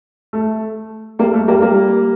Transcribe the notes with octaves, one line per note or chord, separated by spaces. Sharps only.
A3
G3 A#3
A3
G3 A#3
G3 A#3